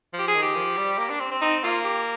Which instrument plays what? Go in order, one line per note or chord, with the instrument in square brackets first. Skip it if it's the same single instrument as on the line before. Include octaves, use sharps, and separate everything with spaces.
[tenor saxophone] F3
[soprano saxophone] G4
G#4
[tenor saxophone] D#3
[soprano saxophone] G4
[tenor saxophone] F3
G3
A#3
D4
C4
C4
[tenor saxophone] C4 [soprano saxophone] D#4
[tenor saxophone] A#3 [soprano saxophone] F4
[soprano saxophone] G4